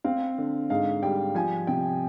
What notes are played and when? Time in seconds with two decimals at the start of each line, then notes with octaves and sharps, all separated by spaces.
0.04 C4 F5
0.38 D3
0.70 G#2 F5
1.02 G3 G5
1.35 F3 G#5
1.67 C3 G5